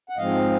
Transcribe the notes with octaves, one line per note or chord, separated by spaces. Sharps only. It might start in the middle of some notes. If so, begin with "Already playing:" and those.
F#5
G#2 F3 G#3 C4 D#5 F5